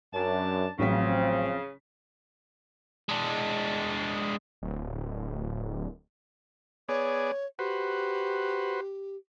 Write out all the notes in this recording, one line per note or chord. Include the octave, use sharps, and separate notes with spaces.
F#2 D4 A5
A1 C#3 F3 F#3 C4 B6
G#3 D4
D1
B3 G#4 C#5 D5
F#4 G4 B4 C5